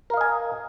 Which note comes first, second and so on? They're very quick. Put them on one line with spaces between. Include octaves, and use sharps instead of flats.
A#4 F5 D#5 G#5